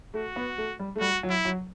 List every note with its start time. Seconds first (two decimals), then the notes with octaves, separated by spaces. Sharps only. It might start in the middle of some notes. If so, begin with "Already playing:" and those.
0.14 A3 F#4
0.36 B3
0.58 A3
0.79 G3
0.96 A3
1.01 G3 F#4
1.23 F#3
1.30 E4
1.45 F#3